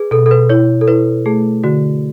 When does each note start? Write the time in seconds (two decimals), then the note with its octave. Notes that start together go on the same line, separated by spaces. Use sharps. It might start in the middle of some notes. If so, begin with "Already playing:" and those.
Already playing: G#4 B4
0.11 B2 A4
0.26 A4
0.31 B4
0.49 E4 C#5
0.81 A4
0.88 E4 B4
1.26 A3 G#4
1.64 D3 F#4